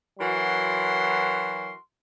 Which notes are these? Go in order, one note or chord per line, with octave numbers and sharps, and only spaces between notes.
E3 F#3 F#4 A#4 C6